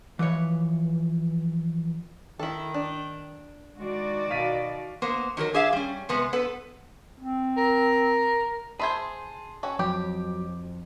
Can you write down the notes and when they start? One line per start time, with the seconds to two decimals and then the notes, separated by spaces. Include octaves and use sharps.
0.19 E3 F3 B4 C#5
2.39 D#3 E4 A4
2.74 D4
3.78 D#3 G#3 F#4 D5
4.30 B2 F5 B6 D#7
5.02 A#3 B3 C5
5.37 D#3 F#3 A4 A#4
5.54 D4 G#4 E5 F5
5.73 G3 C#4
6.09 C3 G#3 B3
6.33 B3 A4 B4
7.20 C4
7.58 A#4
8.80 G#4 C5 E5 A5 B5 C6 G#6
9.63 C#4 F#4 A4
9.79 F2 F#3 G4 D6